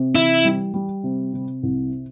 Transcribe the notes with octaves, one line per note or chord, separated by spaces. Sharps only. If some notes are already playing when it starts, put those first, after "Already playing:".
Already playing: C3
E3 E4
G3
G3
C3
C3
C2